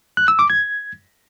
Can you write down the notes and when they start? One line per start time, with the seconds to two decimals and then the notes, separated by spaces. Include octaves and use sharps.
0.17 F#6
0.28 E6
0.39 D6
0.50 G#6